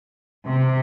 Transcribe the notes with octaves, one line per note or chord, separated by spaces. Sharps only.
C3